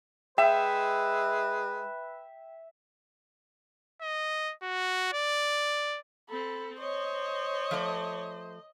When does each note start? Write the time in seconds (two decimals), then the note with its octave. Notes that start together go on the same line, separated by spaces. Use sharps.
0.38 G#3 B4 E5 G5
4.02 D#5
4.62 F#4
5.13 D5
6.29 C4 A4 B5
6.79 C5 C#5 D#5
7.71 F3 A3 D5